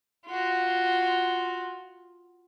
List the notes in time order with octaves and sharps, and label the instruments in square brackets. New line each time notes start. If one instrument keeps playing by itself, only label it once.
[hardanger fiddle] F4 F#4